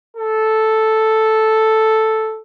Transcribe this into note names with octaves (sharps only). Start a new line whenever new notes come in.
A4